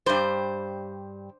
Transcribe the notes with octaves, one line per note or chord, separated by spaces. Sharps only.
G2 G3 C5